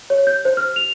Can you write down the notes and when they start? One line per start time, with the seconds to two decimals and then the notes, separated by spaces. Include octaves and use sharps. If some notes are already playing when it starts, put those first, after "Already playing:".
0.10 C#5
0.27 G6
0.45 C5
0.57 F6
0.76 F7